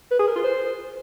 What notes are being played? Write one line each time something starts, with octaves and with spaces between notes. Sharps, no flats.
B4
G#4
A#4
F4
C5